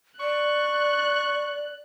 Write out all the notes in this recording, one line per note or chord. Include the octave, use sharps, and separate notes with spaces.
D5 C#6 F#6